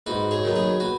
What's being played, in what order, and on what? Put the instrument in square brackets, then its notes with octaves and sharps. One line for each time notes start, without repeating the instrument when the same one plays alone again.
[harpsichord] G#2 F#4 B4
G#4 C#5
D#3 F#3 B3
G#4 C#5
F#4 B4